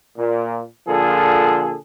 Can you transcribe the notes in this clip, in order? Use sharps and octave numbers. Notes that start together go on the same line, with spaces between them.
A#2
A#2 D3 F3 G#4 A4